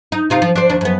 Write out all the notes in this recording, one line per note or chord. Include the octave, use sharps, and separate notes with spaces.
D#4
C3 D#4 F4
F3
D4 C5
D#2 D4
F#2 B3